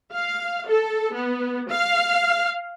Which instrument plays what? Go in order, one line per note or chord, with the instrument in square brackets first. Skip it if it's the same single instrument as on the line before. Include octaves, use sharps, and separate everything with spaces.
[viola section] F5
A4
B3
F5